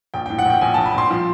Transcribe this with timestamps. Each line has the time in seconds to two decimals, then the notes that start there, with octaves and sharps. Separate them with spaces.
0.14 A#1 G5
0.26 G5
0.30 A2
0.39 F#5
0.46 A#1 G5
0.61 A#1 G#5
0.74 A5
0.78 A#1
0.85 B5
0.94 A#1 C6
1.11 F3